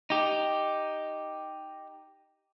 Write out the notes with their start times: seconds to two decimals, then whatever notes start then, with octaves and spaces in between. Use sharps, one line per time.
0.10 D#4 G4